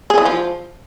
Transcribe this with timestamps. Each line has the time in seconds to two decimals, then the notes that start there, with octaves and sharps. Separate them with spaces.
0.10 G#4
0.18 E3
0.25 F3